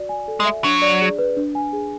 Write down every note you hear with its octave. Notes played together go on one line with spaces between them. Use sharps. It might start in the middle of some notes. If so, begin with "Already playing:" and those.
Already playing: F#4 D5
G#5
A4
G#3
E5
F#3 D4
D5
G#4
B4
D4
G#5
G#4